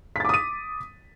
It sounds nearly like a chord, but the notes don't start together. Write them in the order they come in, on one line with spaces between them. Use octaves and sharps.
B6 A6 D6 D#6 D#7